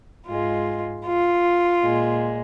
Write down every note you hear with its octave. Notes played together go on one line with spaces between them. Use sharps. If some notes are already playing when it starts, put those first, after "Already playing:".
G#2 G#3 F4
F4
A#2 G#3